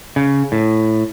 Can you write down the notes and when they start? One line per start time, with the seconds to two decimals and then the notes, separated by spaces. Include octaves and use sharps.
0.16 C#3
0.52 A2